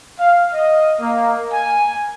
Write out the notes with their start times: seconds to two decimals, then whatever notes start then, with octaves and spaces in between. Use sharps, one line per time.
0.18 F5
0.53 D#5
1.00 A#3
1.52 G#5